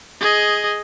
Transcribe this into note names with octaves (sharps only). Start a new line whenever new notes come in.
G#4 D#5